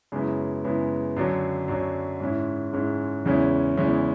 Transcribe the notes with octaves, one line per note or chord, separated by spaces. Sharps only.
F#2 C#3 G#3 B3 E4
F#2 C#3 G#3 B3 E4
F#2 D3 F#3
F#2 D3 F#3
G#2 G#3 C#4 E4
G#2 G#3 C#4 E4
E2 C#3 G#3 C#4 E4
E2 C#3 G#3 C#4 E4